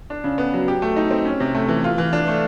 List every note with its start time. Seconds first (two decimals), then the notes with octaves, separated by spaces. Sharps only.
0.10 D4
0.24 C#3
0.38 B3
0.53 F#3
0.68 G4
0.82 A3
0.96 D#4
1.11 C4
1.25 C#4
1.40 C3
1.55 A3
1.69 E3
1.84 F4
1.98 E3
2.13 D4
2.28 A3